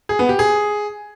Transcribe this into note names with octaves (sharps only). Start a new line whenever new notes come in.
G#4
B3
G4
G#4